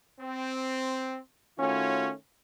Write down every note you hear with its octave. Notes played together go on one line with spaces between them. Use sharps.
C4
D#3 A3 C#4 F4 F#4 C#5